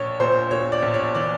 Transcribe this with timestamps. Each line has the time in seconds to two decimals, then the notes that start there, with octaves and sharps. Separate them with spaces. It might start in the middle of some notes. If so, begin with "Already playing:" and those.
Already playing: A#1 C#5
0.20 A#2 C5
0.51 A#2 C#5
0.72 D5
0.83 A#1
0.94 C#5
1.15 E3 D5